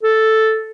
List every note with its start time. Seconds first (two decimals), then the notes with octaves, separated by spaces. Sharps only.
0.03 A4